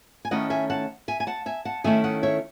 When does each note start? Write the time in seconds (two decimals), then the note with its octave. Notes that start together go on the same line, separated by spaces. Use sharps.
0.25 G#5
0.31 D#3 A3 C#4 E4 D#5 F#5
0.50 E5 G#5
0.70 F#5 A5
1.08 E5 G#5
1.20 G#5
1.27 F#5 A5
1.46 E5 G#5
1.65 F#5 A5
1.84 D#3 A3 C#4 E4 E5 G#5
2.04 D#5 F#5
2.23 C#5 E5